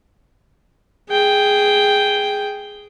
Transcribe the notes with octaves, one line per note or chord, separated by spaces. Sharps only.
G#4 G5